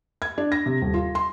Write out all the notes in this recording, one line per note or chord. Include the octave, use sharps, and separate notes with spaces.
G#6
D4
A#6
C3
D#1
F4
C6